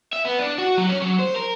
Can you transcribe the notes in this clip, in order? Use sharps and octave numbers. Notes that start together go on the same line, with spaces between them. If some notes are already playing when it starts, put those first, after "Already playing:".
E5
B3
D4
F#4
F#3
C#4
F#3
C5
A#4